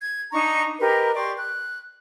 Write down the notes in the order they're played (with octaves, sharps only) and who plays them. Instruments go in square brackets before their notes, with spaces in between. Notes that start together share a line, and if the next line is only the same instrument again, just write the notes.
[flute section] G#6
D4 D#4 A#5 C#6
G4 A#4 B4 D#5
G4 D5 C6 C#6
F#6